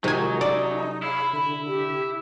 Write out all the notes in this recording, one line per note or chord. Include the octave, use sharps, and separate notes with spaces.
C3 D#3 F3 F#3 G#3 D#4 G#5
C#4 E4 A4 D5
E4 G#4 C#5 F5 B5
D3 B5
G4